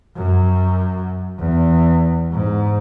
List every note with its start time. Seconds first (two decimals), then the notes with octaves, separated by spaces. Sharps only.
0.15 F#2
1.39 E2
2.31 G#2